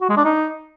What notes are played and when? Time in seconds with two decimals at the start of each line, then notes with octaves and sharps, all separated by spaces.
0.01 F#4
0.09 G#3
0.17 D4
0.25 D#4